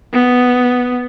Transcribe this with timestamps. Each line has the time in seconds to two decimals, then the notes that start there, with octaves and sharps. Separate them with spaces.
0.13 B3